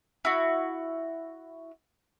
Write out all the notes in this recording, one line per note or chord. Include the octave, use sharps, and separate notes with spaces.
E4 F#4